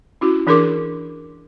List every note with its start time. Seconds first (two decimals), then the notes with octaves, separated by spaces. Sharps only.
0.21 C#4 E4 F#4
0.47 E3 D4 G#4 A#4 C6 D6